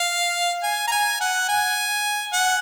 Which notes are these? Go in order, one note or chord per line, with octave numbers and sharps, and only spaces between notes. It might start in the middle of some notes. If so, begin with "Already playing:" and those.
Already playing: F5
G#5
A#5
G#5
F#5
G#5
F#5